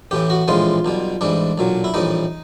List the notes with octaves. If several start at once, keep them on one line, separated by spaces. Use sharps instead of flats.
A1 A2 E3 G4
F#4
A#1 A2 E3 G#3 F4
B1 B2 G3
A1 G#2 E3 G3 D4
B1 A#2 F#3
E4
A#1 A2 E3 G3 D#4